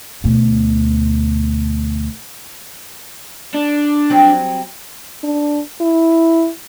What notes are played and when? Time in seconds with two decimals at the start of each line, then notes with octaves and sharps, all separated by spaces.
0.24 D2 B2
3.55 D4
4.10 F#3 G3 C4
5.24 D4
5.81 E4